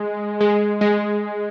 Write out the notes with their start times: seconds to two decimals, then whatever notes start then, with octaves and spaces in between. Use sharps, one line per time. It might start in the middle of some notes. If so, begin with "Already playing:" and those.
Already playing: G#3
0.41 G#3
0.81 G#3